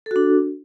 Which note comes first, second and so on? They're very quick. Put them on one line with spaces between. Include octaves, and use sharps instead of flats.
A4 F#4 D4